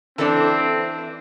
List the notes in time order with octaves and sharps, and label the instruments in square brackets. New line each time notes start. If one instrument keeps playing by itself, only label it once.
[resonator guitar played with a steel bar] E3 D4 [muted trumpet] C4 [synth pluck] A4